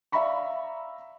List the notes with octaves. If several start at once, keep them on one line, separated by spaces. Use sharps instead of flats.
D5 E5 F5 A#5 B5 C#6